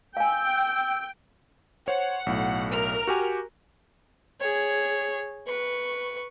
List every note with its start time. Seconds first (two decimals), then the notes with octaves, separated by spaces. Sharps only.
0.17 F5 G5 G#5 E6
1.88 C5 C#5 F#5
2.26 B1 A2
2.72 A#4 F6
3.07 F#4 G4 G#5
4.40 G#4 C#5
5.48 B4 C#6